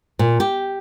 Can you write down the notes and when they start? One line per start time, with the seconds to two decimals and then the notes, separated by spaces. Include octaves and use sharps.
0.19 A#2
0.40 G4